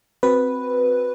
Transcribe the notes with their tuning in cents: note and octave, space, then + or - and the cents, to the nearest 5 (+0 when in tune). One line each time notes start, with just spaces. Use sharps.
C4 +0 F#4 +0 B4 +0